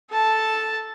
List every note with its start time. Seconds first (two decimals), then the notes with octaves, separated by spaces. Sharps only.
0.11 A4 A5